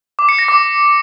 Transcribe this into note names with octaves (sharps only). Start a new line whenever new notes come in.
D6
C#7
A#6
D6